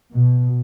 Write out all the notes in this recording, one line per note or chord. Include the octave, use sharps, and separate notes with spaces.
B2